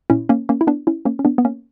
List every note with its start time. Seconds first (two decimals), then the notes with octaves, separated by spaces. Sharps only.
0.10 A#2 C#4 E4
0.29 A#3 C#4
0.49 A#3 C#4
0.61 E4
0.67 B3 D4
0.87 C#4 E4
1.05 A#3 C#4
1.19 C#4
1.25 B3 D4
1.38 B3
1.45 A#3 C#4